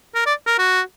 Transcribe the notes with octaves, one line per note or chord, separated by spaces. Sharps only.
A#4
D5
A#4
F#4